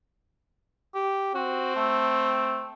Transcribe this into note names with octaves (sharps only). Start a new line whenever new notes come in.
G4
C4 F#4
A3